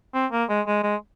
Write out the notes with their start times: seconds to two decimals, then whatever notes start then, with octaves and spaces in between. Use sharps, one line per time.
0.14 C4
0.32 A#3
0.49 G#3
0.67 G#3
0.83 G#3